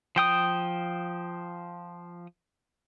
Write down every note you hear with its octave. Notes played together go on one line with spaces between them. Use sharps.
F3 G5 D#6